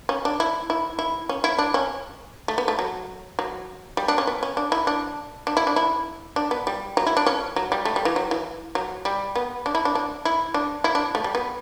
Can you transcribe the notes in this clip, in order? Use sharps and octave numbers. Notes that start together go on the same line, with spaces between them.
C#4
D4
E4
E4
E4
C#4
E4
D4
C#4
A3
B3
A3
F#3
F#3
G3
D4
C#4
B3
C#4
D4
E4
D4
D4
E4
D4
E4
D4
B3
G3
F#3
E4
D4
C#4
F#3
G3
A3
G3
E3
F#3
E3
F#3
G3
B3
D4
E4
D4
D4
E4
D4
E4
D4
A3
G3
B3